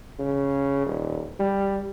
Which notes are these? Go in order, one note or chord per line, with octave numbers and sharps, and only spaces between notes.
C#3
D#1
G3